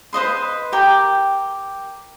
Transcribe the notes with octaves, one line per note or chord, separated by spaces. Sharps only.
B4 C5 D#5 C6
G4 A#4 G5